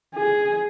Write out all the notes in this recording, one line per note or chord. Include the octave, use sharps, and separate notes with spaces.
G#4